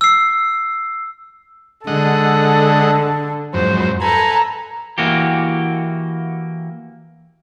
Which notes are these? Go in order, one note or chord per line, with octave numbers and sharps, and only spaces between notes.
E6 C7
D3 G#3 A4 D#5 F#5
F2 G#2 F#3 C5
A4 B4 G#5 A#5
E3 A#3 F#4 G4